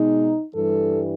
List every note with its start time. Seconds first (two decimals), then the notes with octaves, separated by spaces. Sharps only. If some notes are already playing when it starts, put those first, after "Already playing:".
Already playing: B2 G#3 D#4
0.54 G2 E3 G3 A4